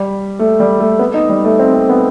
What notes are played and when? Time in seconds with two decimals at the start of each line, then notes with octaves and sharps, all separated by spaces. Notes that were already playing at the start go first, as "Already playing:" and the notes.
Already playing: G3
0.39 A3
0.60 G3
0.80 A3
0.99 B3
1.14 D#4
1.29 G3
1.44 A3
1.59 C4
1.74 C4
1.89 B3